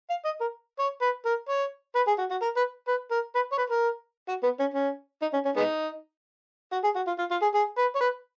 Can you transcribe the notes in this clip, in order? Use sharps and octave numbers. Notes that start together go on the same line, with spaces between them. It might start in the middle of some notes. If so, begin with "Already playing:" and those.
F5
D#5
A#4
C#5
B4
A#4
C#5
B4
G#4
F#4
F#4
A#4
B4
B4
A#4
B4
C#5
B4
A#4
F#4
B3
C#4
C#4
D#4
C#4
C#4
G#3 B3 D#4
F#4
G#4
F#4
F4
F4
F4
G#4
G#4
B4
C#5
B4